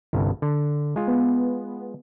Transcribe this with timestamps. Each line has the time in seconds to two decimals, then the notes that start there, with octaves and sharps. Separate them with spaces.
0.13 G1 C2 G2
0.42 D3
0.96 G#3 F4
1.07 B3